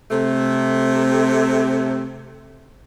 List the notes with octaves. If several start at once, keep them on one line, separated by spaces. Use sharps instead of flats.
C3 A3